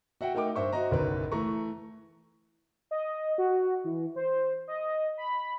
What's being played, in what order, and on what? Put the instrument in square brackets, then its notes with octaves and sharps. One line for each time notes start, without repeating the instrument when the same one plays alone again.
[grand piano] F#4 E5 F#5 G5
A3 D#4 A#4 G5 D6
G2 C5 E5 C#6
F#4 C5 D#5 A#5
F#1 B1 B4
E3 A3 A#5 C#6
[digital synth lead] D#5
F#4
E3
C5
D#5
B5